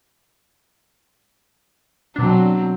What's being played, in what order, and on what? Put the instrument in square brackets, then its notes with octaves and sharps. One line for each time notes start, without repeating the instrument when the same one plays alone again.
[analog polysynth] B2 D4 [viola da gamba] F#3 C4